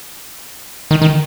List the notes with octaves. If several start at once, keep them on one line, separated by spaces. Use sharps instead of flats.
D#3
D#3